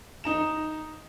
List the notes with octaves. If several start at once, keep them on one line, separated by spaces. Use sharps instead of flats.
D#4 A#5 E7